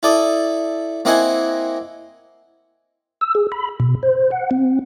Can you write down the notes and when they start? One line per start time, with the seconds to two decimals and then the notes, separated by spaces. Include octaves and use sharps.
0.03 E4 A4 D5 D#6
1.05 A#3 C4 E4 D#5 F#5 G#5
3.21 E6
3.35 G#4
3.52 B5
3.80 B2
4.03 C5
4.31 F#5
4.51 C4